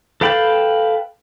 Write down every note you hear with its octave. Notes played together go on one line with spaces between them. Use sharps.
A4 B4 F5 G5 B5